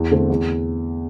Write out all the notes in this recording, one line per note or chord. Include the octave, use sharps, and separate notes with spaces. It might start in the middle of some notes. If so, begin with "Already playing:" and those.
Already playing: E2
D3 A3 C4
E2